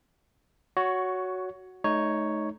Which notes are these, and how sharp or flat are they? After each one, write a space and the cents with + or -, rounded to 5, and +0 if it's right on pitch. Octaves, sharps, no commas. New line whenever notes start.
F#4 +0 C#5 +15
A3 -30 D#4 +0 C#5 +0